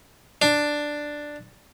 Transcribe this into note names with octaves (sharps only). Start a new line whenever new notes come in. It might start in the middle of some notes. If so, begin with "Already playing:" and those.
D4